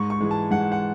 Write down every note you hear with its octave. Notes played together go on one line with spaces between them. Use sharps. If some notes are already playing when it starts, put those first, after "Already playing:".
Already playing: G#2 C#6
C#6
E3 G#3
A5
G#2 F#5
F#5